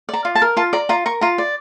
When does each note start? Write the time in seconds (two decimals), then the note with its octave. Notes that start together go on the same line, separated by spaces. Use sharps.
0.09 D5 A#5
0.25 F4
0.35 A5
0.42 A#4
0.57 F4 A5
0.73 D5 A#5
0.89 F4 A#5
1.06 A#4 C#6
1.21 F4 A#5
1.38 D5